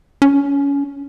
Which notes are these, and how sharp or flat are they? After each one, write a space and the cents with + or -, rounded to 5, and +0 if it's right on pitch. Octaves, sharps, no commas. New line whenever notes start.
C#4 +25